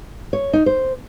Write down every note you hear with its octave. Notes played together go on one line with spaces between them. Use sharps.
C#5
D#4
C5